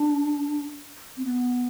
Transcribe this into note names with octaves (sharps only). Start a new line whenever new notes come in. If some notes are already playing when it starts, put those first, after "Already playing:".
Already playing: D4
C4
B3